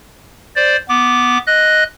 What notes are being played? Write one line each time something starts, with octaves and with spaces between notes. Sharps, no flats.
C5 D5
B3 D6
D#5 F#6